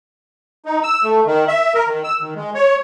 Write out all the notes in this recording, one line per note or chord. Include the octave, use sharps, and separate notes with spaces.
D#4
E6
A3
D#3
E5
A#4
D#3
E6
D#3
G#3
C#5